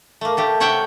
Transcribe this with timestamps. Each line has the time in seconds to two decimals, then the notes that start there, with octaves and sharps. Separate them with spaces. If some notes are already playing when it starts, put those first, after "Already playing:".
0.21 A3 A#3
0.37 A3 G4 A4
0.60 C3 C#5 E5 F#5 G5